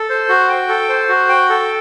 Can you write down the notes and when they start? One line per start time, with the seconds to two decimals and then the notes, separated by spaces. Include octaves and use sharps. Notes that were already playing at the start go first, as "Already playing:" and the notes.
Already playing: A4
0.09 C5
0.29 F#4
0.49 G5
0.69 A4
0.89 C5
1.09 F#4
1.29 G5
1.49 A4